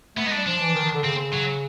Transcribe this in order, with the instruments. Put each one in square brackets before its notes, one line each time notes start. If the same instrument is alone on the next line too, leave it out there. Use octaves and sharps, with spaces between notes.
[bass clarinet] A3 [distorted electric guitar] B3
[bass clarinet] G#3 [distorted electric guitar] D#4
[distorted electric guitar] D4
[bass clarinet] G3
[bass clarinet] F3 [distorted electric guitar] D4
[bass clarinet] E3
D#3
D#3
D3
[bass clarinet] C#3 [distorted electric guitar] C4
[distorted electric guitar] F#3